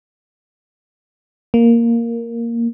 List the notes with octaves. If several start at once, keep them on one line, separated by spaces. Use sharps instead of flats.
A#3